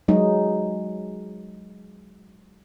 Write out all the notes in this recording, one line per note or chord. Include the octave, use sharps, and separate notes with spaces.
F#3 G#3 D#4